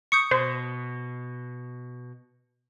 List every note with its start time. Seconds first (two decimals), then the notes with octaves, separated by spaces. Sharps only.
0.12 C#6 D#6 G6 C#7
0.31 B2 C5